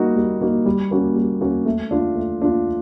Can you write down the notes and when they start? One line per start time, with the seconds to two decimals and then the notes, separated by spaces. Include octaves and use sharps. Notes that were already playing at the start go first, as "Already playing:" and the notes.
Already playing: G3 A#3 D#4 F#4
0.16 G3
0.41 A#3 D#4 F#4
0.66 G3
0.91 A#3 C#4 F#4
1.16 G3
1.41 A#3 C#4 F#4
1.66 A3
1.91 D4 F4
2.15 A3
2.42 D4 F4